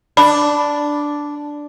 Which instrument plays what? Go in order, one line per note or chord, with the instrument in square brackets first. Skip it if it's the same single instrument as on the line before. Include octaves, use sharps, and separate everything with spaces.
[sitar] D4 [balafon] B5